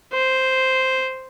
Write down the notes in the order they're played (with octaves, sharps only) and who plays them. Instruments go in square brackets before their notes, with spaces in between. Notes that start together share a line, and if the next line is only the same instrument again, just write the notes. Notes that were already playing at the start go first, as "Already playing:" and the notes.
[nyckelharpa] C5